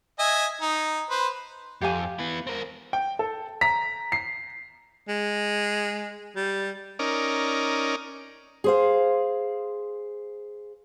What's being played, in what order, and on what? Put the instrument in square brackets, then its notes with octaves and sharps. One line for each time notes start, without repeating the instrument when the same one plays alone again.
[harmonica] D#5 E5 G#5
D#4
B4 C5
[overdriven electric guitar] F2 [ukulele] G4 F5 G#5
[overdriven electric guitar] B3 E4
C4 A#4
[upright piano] G5
A4
A#5 B6
C7
[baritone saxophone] G#3
G3
[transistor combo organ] C#4 D#4 A#4 D5
[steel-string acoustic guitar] G#4 C5 F5